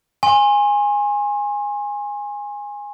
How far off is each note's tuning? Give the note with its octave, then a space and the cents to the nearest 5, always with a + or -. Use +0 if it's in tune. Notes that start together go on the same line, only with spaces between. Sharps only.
G#5 -15 C6 +35